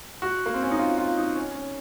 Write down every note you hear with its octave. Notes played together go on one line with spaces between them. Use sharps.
F#4
A#3
C4
C#4
D#4
F4
F4
D#4
C#4
C#4